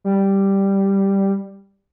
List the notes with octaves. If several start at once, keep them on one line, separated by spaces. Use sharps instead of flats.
G3